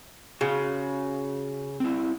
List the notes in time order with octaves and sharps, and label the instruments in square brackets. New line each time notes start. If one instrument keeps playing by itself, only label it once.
[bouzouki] C#3 [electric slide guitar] F#4 F5
[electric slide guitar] C4 E4